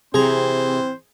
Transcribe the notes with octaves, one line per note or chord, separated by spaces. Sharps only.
C3 E3 C4 G#4 C5 A#5